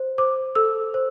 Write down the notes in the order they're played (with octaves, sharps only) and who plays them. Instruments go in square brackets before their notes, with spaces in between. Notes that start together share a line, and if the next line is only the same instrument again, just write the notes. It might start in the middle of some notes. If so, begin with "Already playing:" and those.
Already playing: [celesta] C5
C5 D6
A4 E6
C5